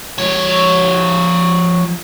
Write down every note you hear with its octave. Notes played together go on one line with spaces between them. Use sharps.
F3 C#5